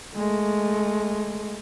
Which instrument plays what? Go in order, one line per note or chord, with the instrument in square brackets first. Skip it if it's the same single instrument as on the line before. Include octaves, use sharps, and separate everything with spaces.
[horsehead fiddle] G#3 A3